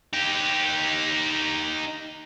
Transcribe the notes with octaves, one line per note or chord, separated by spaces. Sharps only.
D#4 G4